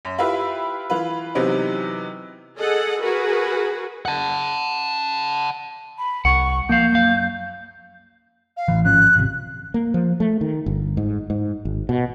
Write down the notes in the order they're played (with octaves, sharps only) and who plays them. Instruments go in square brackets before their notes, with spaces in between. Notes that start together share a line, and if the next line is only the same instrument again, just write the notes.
[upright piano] F#2
E4 F4 G4 B4 E5
E3 F4 B4
C3 E3 F#3 B3 C4 D#4
[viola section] G#4 A4 D#5 F#5
F#4 G#4 A#4 B4
[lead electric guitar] F#5 A5
[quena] B5
[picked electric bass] C2 [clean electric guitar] F#5 [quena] C#6
[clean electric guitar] F3 F5 [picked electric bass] A#3 [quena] G6
[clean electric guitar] F#2 F5
[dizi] F5
[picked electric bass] A1 E3
[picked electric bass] G#1 F3 C#4 [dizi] F#6
[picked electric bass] G#1 C3
[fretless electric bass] A#3
F3
A3
D#3
G1
G#2
G#2
G#1
B2